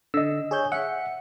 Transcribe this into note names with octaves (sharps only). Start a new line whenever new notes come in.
D3 D#5 E6
G#4 C#5 G6
E5 F#5 C#7